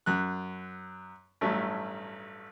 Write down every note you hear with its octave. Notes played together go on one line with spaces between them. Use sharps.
F#2 F#6
A1 G2 F#3 A3